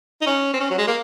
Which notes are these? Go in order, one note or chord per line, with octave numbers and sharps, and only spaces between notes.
D#4
C#4
C4
C#4
F#3
G#3
A#3